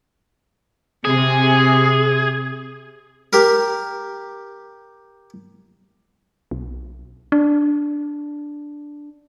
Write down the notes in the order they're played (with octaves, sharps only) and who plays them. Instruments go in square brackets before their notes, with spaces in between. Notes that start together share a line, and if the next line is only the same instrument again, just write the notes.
[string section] C3 [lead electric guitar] G#4
[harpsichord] G4 A#4
[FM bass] B1
D4